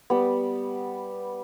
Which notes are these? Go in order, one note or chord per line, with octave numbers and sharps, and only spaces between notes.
G3 B3